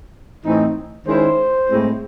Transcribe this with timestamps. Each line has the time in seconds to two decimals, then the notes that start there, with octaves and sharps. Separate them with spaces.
0.44 A2 E3 C4 D#4
1.06 D#3 G#3 C#4 E4 C5
1.68 A2 G#3 C4 E4